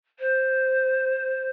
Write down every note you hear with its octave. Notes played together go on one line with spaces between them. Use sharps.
C5